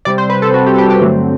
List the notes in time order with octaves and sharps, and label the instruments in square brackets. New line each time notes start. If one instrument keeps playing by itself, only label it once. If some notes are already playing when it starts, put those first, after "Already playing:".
[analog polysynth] C3 G3 C4 D5
C5
B4
A4
F#4
G4
A4
G4
G4
G2 D3 F#3 A3 C4